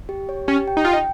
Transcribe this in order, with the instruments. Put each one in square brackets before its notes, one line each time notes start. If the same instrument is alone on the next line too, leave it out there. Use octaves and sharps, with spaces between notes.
[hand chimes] G4
C#5
[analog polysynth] C#4 [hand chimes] G4
[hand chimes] G5
[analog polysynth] D#4
[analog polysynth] F4 [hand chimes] G5
[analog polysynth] D#4